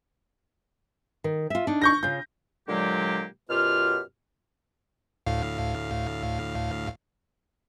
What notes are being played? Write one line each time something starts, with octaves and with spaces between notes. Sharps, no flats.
D#3
F4 E5
D4 D#4
C#6 G6 A#6
C#3 F4 G6
A#2 D3 F#3 G#3 A#3 G4
F#2 B2 F4 G4 F6
D2 A2 F5